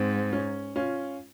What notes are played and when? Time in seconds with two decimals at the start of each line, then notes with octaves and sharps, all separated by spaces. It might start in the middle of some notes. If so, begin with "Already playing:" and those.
Already playing: G#2 C4
0.33 C#4
0.76 C#4 F4